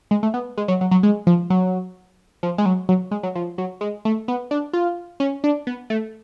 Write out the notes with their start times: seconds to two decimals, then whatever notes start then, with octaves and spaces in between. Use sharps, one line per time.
0.11 G#3
0.23 A3
0.34 B3
0.57 G#3
0.68 F#3
0.81 F#3
0.91 F#3
1.03 G#3
1.27 F3
1.50 F#3
2.43 F3
2.58 G#3
2.66 F#3
2.89 F#3
3.11 G#3
3.23 F#3
3.35 F3
3.58 F#3
3.81 G#3
4.05 A3
4.28 B3
4.51 D4
4.73 F4
5.20 C#4
5.44 D4
5.67 B3
5.90 A3